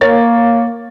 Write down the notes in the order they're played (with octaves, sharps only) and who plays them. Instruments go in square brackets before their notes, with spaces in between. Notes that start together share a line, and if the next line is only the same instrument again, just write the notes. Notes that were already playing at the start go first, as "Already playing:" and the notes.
[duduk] A#3 [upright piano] A#4 C#5 A6